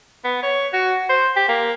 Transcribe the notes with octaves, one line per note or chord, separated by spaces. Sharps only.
B3
C#5
F#4
C5
G4
A#3